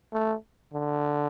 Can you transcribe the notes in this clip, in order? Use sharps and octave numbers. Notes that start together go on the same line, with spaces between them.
A3
D3